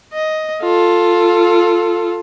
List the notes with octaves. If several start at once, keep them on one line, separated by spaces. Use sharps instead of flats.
D#5
F4 A4